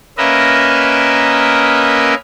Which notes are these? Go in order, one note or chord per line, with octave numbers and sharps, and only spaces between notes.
A#3 C#4 A#4 B4 D#5 E5